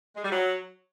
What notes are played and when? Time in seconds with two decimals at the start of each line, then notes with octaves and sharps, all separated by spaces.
0.16 G#3
0.24 G3
0.31 F#3